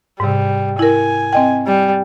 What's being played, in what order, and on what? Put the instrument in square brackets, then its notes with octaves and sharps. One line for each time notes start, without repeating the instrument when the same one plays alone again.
[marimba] G#2 C3 [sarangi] G3
[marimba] E4 A#4 [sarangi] G#5
[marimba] C4 D#5 G5
[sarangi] G3